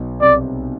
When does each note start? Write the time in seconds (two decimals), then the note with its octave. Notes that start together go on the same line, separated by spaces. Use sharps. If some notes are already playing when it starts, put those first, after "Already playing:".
Already playing: B1 B2
0.21 C2 C3 D5